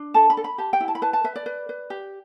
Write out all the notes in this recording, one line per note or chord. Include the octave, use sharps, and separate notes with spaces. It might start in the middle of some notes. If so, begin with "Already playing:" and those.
Already playing: D4
A4 A5
B5
A4
B5
G4 A5
G5
E4
A5
B5
B4 A5
A5
B4 E5
D5
B4
B4
G4